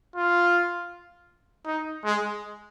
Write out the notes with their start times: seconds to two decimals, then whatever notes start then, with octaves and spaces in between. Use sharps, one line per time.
0.16 F4
1.66 D#4
2.05 G#3